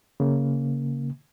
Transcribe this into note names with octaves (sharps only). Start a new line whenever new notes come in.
C#3 A#3